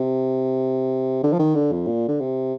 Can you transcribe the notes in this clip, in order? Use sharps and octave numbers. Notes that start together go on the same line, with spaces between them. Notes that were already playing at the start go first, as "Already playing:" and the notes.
Already playing: C3
D3
F3
D#3
D3
F2
A#2
D3
C3